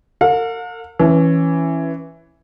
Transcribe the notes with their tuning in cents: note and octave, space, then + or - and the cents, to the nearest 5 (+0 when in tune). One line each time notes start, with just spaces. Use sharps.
A#4 -45 F5 +45
E3 +0 C#4 -10